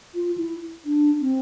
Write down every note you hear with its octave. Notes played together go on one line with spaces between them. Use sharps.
F4
E4
D4
C4